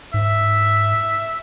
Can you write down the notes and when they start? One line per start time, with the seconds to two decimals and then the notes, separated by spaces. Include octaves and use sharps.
0.14 G#2 E5